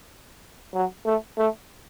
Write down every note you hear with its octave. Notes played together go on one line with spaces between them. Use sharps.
F#3
A3
A3